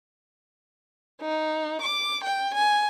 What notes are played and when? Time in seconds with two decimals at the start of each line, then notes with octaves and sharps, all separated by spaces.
1.21 D#4
1.82 D6
2.24 G5
2.55 G#5